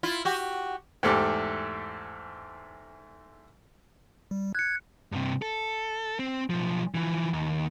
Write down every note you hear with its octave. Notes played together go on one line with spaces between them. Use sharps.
E4 F4
F#4 G4
E2 G#2 A3 G4
G3
F#6 G#6 C#7
G2 C3
A4
C4
B1 F3
E3 F3
D#2